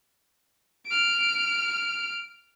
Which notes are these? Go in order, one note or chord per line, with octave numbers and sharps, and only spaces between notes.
F6 D7